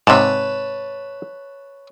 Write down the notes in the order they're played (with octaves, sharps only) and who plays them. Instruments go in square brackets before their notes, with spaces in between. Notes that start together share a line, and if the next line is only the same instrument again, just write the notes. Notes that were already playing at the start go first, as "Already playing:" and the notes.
[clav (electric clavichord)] G#2 C3 [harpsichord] B4 C#5 A5